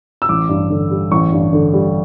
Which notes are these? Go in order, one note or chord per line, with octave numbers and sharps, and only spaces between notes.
E6
A1 D6
G2
D3
G3
A1 C#6
G2
D3
G3